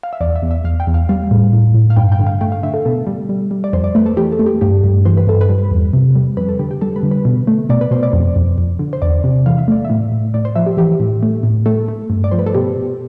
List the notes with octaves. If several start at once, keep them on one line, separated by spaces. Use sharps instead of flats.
F5
E5
E2 D5
E5
E2
E5
E2 F5
G5
E2
F5
G3 F5
A2
A2
A2
F5
G2 G5
G5
D3
F5
A3 G5
F5
D3 E5
A4
B2 A4
G3
G3
G3
D5
F2 C5
D5
A3 B4
A4
E3 G4
A4
A3
G4
G2 G4
G2
E3 C5
B4
G2 A4
B4
G3
E2
C3
G3
F2 B4
A4
D3 G4
G4
G3 A4
B4
D3
B4
B2
A3
B2 D5
B4
B2 C5
D5
F2
F2
F2
D3
C5
E2 D5
C3
E3 F5
E5
A3 D5
E5
A2
A2
A2 D5
C5
F3 E5
G4
E3 G4
A2
A3
A2
A3 A4
A3
G2
D5
F3 C5
B4
A4
B2 G4
B2